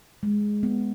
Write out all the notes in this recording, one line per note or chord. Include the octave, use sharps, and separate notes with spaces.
G#3
B3